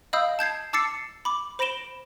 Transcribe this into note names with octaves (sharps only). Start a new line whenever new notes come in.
D#5 F5 B5 D#6 E6 G6
A5 G6 G#6 C7
A5 D6 E6 A6 C7 C#7
B5 D6
C5 B5 A#6 D7 E7 G7